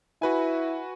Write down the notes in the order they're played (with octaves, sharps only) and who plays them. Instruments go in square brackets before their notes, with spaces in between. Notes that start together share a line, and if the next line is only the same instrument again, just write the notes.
[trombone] E4 [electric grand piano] F#4 B4 G#5